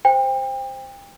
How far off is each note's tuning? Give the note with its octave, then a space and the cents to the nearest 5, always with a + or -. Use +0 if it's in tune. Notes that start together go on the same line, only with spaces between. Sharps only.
C5 +0 G5 +30